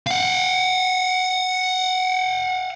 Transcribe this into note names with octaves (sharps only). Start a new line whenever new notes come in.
F5 F#5